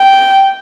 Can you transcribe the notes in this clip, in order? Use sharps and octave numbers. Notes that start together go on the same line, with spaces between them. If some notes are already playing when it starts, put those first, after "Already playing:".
Already playing: G5